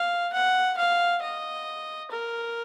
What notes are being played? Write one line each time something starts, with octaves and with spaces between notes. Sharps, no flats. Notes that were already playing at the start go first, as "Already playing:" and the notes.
Already playing: F5
F#5
F5
D#5
A#4